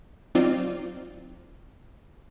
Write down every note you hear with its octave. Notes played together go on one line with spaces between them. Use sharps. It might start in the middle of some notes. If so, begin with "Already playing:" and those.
F#3 C4 D#4 F4 D5